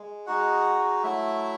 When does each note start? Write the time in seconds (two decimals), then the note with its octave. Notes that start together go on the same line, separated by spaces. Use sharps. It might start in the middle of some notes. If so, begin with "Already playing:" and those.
Already playing: G#3
0.26 G#3 D#4 F#4 F#5
1.03 F#3 A3 E4 E5